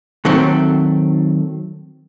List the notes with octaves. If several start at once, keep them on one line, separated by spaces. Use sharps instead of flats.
D#3 F#3 A3 C4